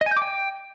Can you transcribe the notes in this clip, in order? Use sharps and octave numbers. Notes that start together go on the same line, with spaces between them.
D#5
G#5
G6
D6
G5